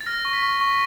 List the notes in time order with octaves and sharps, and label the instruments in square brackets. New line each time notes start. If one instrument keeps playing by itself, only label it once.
[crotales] A6
F6 A#6
C#6
B6
C#6
C#6